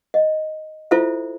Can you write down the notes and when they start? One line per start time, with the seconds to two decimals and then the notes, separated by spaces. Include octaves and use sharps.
0.14 D#5
0.91 E4 F4 A4 C5 E5